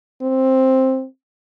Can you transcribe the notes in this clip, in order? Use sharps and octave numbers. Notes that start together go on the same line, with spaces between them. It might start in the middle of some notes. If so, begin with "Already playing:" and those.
C4